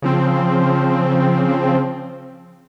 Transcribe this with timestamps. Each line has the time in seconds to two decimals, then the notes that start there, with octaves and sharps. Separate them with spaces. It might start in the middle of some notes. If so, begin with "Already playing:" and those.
0.02 C#3 F3 C4